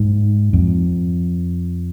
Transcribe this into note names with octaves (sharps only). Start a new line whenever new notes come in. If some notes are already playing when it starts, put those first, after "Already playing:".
Already playing: G#2
F2